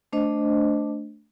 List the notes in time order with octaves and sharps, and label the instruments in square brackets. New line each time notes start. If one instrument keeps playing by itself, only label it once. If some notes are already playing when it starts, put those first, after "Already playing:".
[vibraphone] A3 D4 C5 D#5